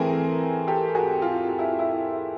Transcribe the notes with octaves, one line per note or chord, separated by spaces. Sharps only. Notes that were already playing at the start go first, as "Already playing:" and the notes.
Already playing: E3 A3 C4 G#4 A#4
G4 A4
F#4 G#4
F4
F4
E4
E4